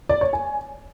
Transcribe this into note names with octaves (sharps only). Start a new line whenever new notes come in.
D5
C#5
G#5